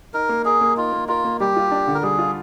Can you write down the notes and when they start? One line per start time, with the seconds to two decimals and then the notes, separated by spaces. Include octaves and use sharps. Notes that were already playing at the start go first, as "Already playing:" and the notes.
0.14 D#4 A#4
0.29 A#3
0.45 G#4 A#4
0.61 A#3
0.77 D#4 F4
0.93 A#3
1.08 F4 A#4
1.25 A#3
1.40 G3 G4
1.56 F4
1.71 D4
1.87 D3
1.94 A#4
2.03 G3 G#4
2.19 F4